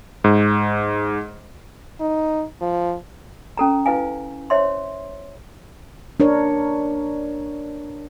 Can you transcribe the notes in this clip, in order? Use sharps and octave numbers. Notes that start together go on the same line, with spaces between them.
G#2
D#4
F3
C#4 A4 A#5
E4 B4 F5 G#5
C5 C#5 E5 C6
D4 A#4 C#5